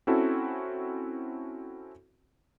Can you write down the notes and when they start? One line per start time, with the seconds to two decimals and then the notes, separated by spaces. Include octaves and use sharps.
0.07 C4 C#4 E4 F#4 A4